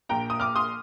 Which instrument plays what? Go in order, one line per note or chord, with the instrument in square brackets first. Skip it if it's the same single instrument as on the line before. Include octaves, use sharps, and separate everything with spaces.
[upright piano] A#1 A#2 G5 A#5
D#6
D6 F6
C6 D#6